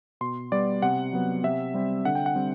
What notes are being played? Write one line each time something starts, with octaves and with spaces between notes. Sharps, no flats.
B2 C6
G3 B3 D5
C3 F#5
F#3 B3
C3 E5
G3 C4
D3 F#5
G5
F#5
G3 C4